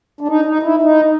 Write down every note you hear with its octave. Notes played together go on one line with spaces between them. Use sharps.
D4
D#4
D#4
E4
D#4